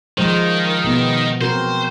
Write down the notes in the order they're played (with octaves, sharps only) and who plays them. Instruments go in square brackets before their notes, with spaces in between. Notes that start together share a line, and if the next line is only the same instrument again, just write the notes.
[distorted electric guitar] D#3 [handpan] F3 G#3 C5
[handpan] B2 B3
[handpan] C4 F#4 A#4 [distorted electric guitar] C5